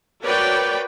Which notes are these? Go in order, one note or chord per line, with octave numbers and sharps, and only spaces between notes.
F#4 A#4 B4 C#5 D5 G5